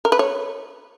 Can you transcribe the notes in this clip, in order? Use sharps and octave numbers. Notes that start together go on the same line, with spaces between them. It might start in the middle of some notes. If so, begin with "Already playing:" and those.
A#4
B4
C#5